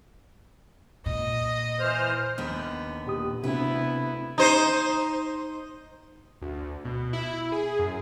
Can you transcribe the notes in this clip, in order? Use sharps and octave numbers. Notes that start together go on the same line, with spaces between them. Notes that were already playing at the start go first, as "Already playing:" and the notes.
A#2 D#5
E3 C5 F6
D#2 D3 B3
A#2 G4 D#6
D2 C3 B3 C4 E4 B4
D#4 C5
D2
B2
E4
G#4
F#2